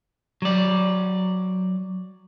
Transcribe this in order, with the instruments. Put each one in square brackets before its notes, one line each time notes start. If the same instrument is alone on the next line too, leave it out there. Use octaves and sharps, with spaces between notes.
[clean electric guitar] F#3 D5